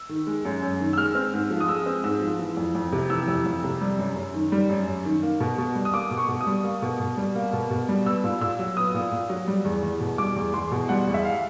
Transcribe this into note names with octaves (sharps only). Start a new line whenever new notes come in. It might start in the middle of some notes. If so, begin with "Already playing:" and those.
Already playing: E6
D#3
G#3
F#2
F#2
D#3
E6
G#3 F6
C4
G#2
F3
D#6
G#3 E6
C4
G#2 E6
F3
E3
F2
F2
C3
E3 E6
F2
F2
C3
G3
F#2
F#2
D#3
G3
F#2
F#2
D#3
A#3
B2
B2
G3
D#6
A#3 D6
B2
C#6
B2
D#6
G3
A#3
B2
B2
G3
A#3
B2
B2
G3
B3 E6
A#2
A#2 E6
F#3
B3 D#6
A#2
A#2
F#3
G3
E2
E2
B2
G3 D6
E2
E2 C6
B2
G3 F#5
E2
E5
F5